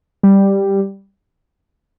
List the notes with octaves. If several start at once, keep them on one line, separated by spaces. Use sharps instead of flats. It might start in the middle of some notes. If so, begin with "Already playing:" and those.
G3